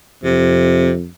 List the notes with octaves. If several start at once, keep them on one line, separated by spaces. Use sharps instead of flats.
F2 C3